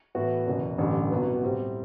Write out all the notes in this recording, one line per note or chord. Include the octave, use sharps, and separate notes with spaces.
A2 E3 B3 F#4
F#1 E2 B2
A1 G2 D3
C2 B2 F#3 B3
A2 G3 C4